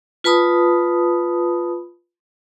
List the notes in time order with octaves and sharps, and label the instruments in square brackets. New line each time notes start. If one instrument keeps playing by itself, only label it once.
[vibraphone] F4 B4 A5 B5 D#6